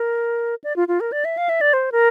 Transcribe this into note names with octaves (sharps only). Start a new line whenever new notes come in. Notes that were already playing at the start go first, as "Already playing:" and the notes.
Already playing: A#4
D5
F4
F4
A#4
D5
E5
F5
E5
D5
C5
A#4